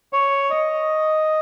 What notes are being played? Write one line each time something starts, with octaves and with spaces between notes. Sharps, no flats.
C#5
D#5